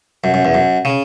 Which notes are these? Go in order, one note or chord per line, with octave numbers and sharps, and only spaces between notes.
F#2
F#2
E2
F#2
C#3